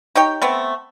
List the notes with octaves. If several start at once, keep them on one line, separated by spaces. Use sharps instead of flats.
D#4 G4 C#5 G5
A3 B3 C4